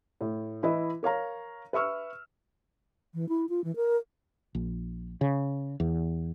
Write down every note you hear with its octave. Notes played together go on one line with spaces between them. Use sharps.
A2
E3 E4 B4 D#5
A#4 C#5 F5 A#5
B4 E5 C#6 E6 F6
E3
E4
F4
E3
A#4
A#1
C#3
E2